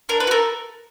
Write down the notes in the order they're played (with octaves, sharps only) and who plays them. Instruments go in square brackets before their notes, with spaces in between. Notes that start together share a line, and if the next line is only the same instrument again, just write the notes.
[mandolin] D4 A#4
B4
F#4
A4 A#4